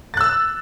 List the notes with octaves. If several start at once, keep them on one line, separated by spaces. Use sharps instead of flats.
E6 F#6 A6